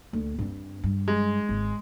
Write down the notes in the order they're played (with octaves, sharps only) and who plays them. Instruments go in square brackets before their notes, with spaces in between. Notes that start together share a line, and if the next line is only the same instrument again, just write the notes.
[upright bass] D2
G2 C4
G2
[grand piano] G#3
[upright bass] G#1